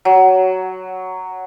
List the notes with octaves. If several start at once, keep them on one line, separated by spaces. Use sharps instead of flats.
F#3